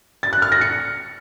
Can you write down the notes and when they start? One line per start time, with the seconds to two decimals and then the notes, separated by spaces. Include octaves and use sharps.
0.23 A6
0.33 F#6
0.42 F6
0.52 A#6
0.61 C#7